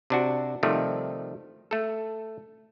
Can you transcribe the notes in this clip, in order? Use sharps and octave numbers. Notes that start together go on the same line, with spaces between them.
C3 D4 F#4
C3 D#3 F3 G3 A3
A3 A4